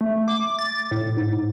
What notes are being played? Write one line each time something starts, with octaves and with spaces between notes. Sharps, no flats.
A3
D6
A6
A2
G#2